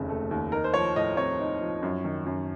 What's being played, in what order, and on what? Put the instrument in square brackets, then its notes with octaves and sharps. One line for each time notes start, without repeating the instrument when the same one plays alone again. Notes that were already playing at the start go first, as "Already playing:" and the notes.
Already playing: [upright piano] F1 D#2 C#3
A3
D#2
D#4 A#4
C5
F3 C#5
A2 D#5
C4 C#5
D#4
F3
F#2
D#3
F#2